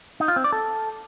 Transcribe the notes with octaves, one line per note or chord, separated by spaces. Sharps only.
D#4
F4
C4
D5
A4